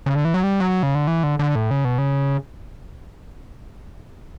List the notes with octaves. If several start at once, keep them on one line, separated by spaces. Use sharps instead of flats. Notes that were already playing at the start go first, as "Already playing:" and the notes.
C#3
D3
E3
F#3
G3
F#3
C#3
D3
E3
D3
D3
A2
C#3
B2
C#3